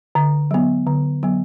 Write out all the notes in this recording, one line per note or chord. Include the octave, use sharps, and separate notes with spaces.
D3
F#3 B3
D3
F#3 B3